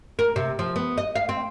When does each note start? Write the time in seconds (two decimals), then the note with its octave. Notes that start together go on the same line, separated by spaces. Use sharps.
0.19 A#4
0.36 C3
0.59 F3
0.76 B3
0.98 D#5
1.16 F5
1.29 C4